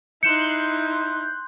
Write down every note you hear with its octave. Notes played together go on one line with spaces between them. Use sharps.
D#4 E4 C6 F#6 G6 C#7 E7